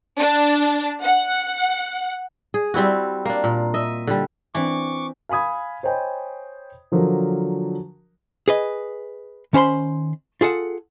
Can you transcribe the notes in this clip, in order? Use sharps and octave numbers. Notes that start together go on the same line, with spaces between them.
D4
F#5
G#4
G3 C4 E4 F#4
A#3 D4
A#2
D#5 E5
D3 G3
E3 C4 D4 C#6 D6
F5 G#5 B5 D#6 G#6
C5 C#5 D#5 G5 G#5 B5
D3 F3 F#3 A#4
G#4 B4 D#5
D#3 C#4 C5 B5 C6
F4 G#4 A4 F#5